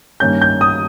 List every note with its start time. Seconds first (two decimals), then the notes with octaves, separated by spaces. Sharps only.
0.20 G2 D#3 A#3 C#4 G6
0.41 G6
0.61 D#6